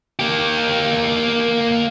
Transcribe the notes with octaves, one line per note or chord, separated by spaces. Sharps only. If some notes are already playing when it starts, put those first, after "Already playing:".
A#3 G4